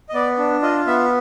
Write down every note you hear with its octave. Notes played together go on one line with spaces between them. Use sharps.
D#5
B3 D5
D4
F4 D#5
B3 E5